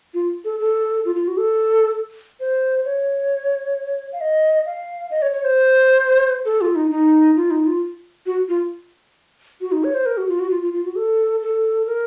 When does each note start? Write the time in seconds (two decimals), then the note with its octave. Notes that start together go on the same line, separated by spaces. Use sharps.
0.14 F4
0.45 A4
0.60 A4
1.05 F4
1.15 F4
1.28 F#4
1.38 A4
2.40 C5
2.85 C#5
4.12 F5
4.21 D#5
4.66 F5
5.11 D#5
5.22 C#5
5.33 C#5
5.44 C5
6.45 A4
6.61 F4
6.76 D#4
6.91 D#4
7.36 F4
7.51 D#4
7.66 F4
8.26 F#4
8.49 F4
9.61 F#4
9.72 D#4
9.84 C#5
9.94 C5
10.06 A#4
10.17 F#4
10.29 F4
10.39 F#4
10.51 F4
10.62 F4
10.73 F4
10.85 F#4
10.96 A4
11.42 A4
11.87 A#4